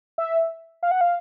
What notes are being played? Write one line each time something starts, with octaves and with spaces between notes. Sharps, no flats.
E5
F5
F#5
F5